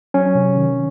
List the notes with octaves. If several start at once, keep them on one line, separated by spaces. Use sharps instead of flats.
F#3 C#4
C3
D#3